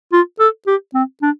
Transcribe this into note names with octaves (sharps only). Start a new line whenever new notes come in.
F4
A4
G4
C4
D4